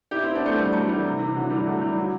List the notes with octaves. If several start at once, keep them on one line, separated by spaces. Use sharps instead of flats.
E4 G4
C4 E4
B3 D4
A3 C4
G3 B3
F#3 A3
E3 G3
C3
C3 E3
D3 F#3
E3 G3
F#3 A3
E3 G3
D3 F#3